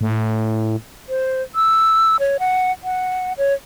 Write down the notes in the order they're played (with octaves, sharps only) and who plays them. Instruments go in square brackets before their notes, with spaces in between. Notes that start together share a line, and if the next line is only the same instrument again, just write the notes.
[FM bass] A2
[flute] C5
E6
C#5
F#5
F#5
C#5